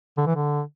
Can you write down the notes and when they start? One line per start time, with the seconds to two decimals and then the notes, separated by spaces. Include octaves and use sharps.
0.17 D3
0.27 E3
0.36 D3